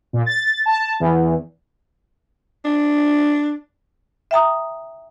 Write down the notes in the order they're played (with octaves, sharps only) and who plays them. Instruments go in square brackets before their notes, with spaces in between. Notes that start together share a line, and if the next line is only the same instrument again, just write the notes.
[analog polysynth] A#2
A6
A5
E2
[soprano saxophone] D4
[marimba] E5 G5 A#5 D#6